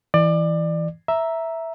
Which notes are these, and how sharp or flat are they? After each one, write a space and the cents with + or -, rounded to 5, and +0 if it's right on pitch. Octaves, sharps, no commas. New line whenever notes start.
E3 -5 D5 +25
E5 +0 A#5 +5